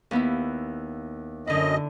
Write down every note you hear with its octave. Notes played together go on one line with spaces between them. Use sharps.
D#2 B3 E4
F#2 D3 E4 D#5